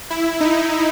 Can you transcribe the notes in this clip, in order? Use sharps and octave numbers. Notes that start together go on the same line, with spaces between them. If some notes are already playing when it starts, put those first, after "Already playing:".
E4
D#4